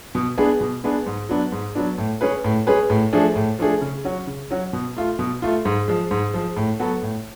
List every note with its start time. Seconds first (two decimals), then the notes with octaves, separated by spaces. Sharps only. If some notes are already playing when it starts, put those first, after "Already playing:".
0.15 B2
0.38 G#3 B3 D4 G#4
0.61 B2
0.84 G#3 B3 D4 G#4
1.06 G#2
1.29 F#3 B3 D4
1.52 G#2
1.75 F#3 B3 D4
1.98 A2
2.21 G#3 C#4 G#4 B4
2.44 A2
2.67 G#3 C#4 G#4 B4
2.90 A2
3.13 F3 A3 D4 G#4
3.36 A2
3.59 F3 A3 D4 G#4
3.81 C#3
4.05 F#3 C#4 F#4
4.27 C#3
4.51 F#3 C#4 F#4
4.73 B2
4.96 A3 F4
5.19 B2
5.42 A3 F4
5.65 G#2
5.88 F3 G#3
6.11 G#2
6.34 F3 G#3
6.57 A2
6.80 F#3 B3 F#4 A4
7.02 A2